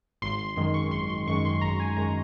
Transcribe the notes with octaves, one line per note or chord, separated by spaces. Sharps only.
G#1 C6
C6
F#2 D#3 G#3 C6
C#6
G#1 C6
C6
F#2 D#3 G#3 C#6
C6
G#1 A#5
G#5
F#2 D#3 G#3 A#5